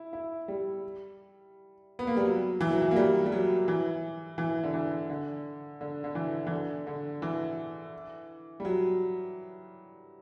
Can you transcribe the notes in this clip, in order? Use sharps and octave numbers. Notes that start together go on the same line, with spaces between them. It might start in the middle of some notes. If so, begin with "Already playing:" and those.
Already playing: E4
E4
G3
B3
A#3
G3
F#3
E3
F#3
E3
A#3
G3
G3
F#3
E3
E3
D3
E3
D3
D3
D3
E3
E3
D3
D3
E3
G3
F#3